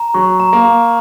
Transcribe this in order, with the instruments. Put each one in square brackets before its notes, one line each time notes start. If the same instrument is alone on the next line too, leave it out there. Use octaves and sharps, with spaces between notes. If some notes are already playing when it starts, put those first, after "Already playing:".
Already playing: [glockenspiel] A#5
[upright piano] F#3 [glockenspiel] C#6
[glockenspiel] A#5
[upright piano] A#3
[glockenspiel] A#5